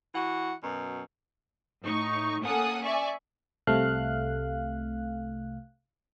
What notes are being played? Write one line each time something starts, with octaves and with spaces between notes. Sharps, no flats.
E3 F#4 F#5
F#2 B2
A2 D#4 C#6
A#3 C#4 A4 F#5 G#5 D#6
D5 E5 G#5 C#6
C2 C3 A3 F5 F#6